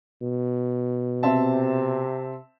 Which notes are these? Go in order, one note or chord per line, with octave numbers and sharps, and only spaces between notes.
B2
C3 C4 E5 A5